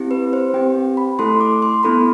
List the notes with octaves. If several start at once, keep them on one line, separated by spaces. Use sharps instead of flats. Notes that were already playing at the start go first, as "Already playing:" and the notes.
Already playing: C4 E4 G4
B4
C5
C4 G4 G5
B5
A3 E4 A4 C6
D6
C6
B3 E4 A4 B5